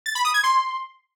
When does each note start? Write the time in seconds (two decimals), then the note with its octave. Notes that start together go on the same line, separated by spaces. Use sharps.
0.06 A6
0.15 B5
0.25 D#6
0.34 G#6
0.44 C6